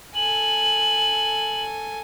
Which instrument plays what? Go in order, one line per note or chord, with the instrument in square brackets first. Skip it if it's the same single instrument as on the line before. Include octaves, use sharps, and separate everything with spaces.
[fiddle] A4 G#5 [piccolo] F#7